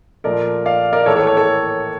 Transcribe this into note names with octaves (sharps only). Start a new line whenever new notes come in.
A#2 F3 A3 A#4 D5
D5 F5
A#4 D5
A2 E3 A#3 A4 C#5
A4 C#5
A4 C#5
A4 C#5